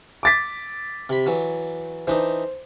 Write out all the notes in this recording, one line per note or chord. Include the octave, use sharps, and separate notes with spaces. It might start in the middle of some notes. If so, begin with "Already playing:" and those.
D6 A6 B6
C3 B5
E3 F#3
E3 D4 D#4 C5